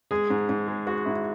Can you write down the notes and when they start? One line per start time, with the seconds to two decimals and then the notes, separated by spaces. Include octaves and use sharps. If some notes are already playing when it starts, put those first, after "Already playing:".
0.11 G#3 G#4
0.30 G#2
0.49 G#2
0.68 G#3
0.87 G#3 F#4
1.05 G#2 E4